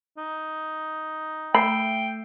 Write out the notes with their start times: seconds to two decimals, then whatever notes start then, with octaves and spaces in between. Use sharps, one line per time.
0.18 D#4
1.55 A3 G5 B5 E6 C7